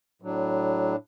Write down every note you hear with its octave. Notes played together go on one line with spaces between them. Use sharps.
A2 F#3 D4